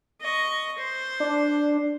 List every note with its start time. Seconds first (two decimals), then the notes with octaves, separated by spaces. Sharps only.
0.21 D#5 C#6
0.78 C5
1.20 D4